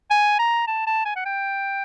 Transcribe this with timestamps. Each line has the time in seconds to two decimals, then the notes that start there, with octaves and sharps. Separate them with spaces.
0.11 G#5
0.39 A#5
0.68 A5
0.87 A5
1.06 G#5
1.16 F#5
1.26 G5